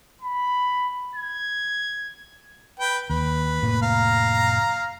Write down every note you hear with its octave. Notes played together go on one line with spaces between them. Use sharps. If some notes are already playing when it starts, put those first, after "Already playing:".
B5
G#6
B4 G5
D#2 B4
F1 A2 A#3
F5 A#5